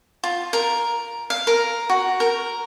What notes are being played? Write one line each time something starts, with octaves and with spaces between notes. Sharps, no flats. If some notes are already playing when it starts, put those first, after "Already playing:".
F4
A#4
F5
A#4
F#4
A#4